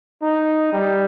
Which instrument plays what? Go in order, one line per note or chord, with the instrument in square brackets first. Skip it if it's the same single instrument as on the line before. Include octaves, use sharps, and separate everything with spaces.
[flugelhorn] D#4
G3